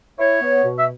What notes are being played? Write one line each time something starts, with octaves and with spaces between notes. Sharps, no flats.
E4 C#5
B3
B2
E5